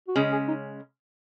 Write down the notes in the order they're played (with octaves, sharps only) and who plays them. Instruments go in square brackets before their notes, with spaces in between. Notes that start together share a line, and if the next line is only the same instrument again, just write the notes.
[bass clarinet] F#4
[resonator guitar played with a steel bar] C#3 G#3 C#4 [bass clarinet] G#4
[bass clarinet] G#4
D#4